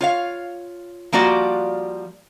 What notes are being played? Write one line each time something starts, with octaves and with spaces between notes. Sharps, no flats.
F4 C#5 F5
F3 G3 A#3 F4 F#4 D5